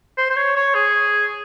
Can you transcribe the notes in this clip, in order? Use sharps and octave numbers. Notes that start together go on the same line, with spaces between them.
C5
C5
C#5
C#5
G#4